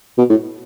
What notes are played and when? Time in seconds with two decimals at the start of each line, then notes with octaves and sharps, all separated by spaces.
0.18 B2
0.30 A2